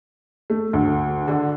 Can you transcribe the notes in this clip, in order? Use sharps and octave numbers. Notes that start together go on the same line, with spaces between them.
A3
D2
D3